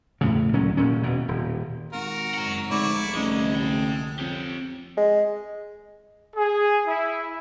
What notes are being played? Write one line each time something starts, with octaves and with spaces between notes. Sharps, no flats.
E2 A2 C#3
D2 A#2 F#3 C#4
D#1 A#2 C#4
E1 B2 E3
D#1
G#1 F#4 A#4
F#1 G#2 F#5 A#5
F1 C2 G#2 D3 E4 D5 C#6
A1 G#3 E4 D#5
A3 G5
F2 G4 C#5
G#3
G#4
E4